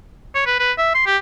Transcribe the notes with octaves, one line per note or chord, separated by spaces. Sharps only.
C#5
B4
B4
E5
C6
G4